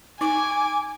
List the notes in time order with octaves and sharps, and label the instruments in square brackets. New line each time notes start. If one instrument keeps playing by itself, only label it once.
[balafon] D#4 [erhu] G#5 [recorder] D6